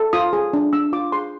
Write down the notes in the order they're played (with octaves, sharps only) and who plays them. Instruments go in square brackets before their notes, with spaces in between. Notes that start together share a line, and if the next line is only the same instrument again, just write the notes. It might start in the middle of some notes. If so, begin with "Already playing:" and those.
Already playing: [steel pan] A4
F4 D#6
G#4
D4
D4 E6
F4 D6
G#4 C6